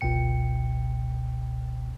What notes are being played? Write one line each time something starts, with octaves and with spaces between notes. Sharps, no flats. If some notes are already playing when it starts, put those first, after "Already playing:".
G1 C#2 B2 G5 C#7